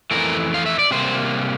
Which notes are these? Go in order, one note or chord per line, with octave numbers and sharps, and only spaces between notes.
F2 E3 A3 A#4
F5
E5
D5
C3 G3 A#3 C5